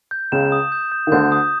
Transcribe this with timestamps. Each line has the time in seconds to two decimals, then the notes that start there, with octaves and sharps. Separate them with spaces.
0.11 G6
0.32 C#2 C#3 E7
0.52 D#6
0.72 G6
0.92 G6
1.07 D#3
1.12 D2 D3 G6
1.32 D#6